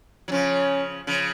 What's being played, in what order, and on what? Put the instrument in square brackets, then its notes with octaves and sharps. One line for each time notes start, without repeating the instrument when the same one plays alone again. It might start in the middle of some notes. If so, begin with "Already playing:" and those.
[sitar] F#3
[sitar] C#3 F3 [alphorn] C#4
[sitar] C#3 F3